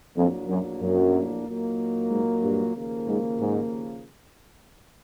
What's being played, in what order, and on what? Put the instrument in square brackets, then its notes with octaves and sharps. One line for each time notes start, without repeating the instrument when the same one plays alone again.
[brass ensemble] A#1 A2 F#3 A#3 D4 [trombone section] F2
[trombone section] F#2
F#2
[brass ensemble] A#2 F#3 A#3 D#4
[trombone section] G#2
G2
[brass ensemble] D#2 C#3 F3 A#3
[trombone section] G#2
G#2